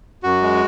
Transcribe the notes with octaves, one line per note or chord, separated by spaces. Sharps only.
F#2 F#4
G#3